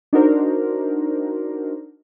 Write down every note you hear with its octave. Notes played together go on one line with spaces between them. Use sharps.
D4 D#4 F#4 A#4 C5